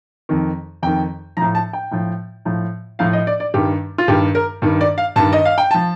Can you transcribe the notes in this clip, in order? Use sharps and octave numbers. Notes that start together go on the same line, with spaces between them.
F2 D#3
F2 D#3 G5
A2 F3 A#5
A5
G5
A2 F3
A2 F3
A2 F3 F5
D#5
D5
D5
G2 D#3 G4
F4
G2 D#3 G4
A#4
G2 D#3
D5
F5
G2 D#3 A5
D#5
F5
G5
F3 A5